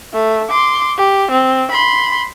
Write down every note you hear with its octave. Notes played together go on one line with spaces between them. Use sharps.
A3
C6 D6
G4
C4
B5 C6